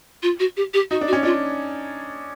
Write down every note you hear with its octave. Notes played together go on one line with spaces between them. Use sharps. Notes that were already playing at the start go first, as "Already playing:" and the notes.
F4
F#4
G4
G4
D#4 F#4
D4
F#4
C#4
D4 F4